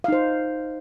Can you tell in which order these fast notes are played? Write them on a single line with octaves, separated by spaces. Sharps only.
F5 D#4 C5